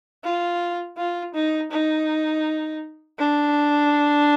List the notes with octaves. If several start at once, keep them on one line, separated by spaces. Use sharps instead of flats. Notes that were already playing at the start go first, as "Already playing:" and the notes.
F4
F4
D#4
D#4
D4